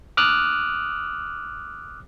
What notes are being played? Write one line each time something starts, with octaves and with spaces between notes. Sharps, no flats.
D6 D#6 F6 F#6